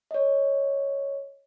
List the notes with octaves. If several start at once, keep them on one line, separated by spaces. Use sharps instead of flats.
C#5 D#5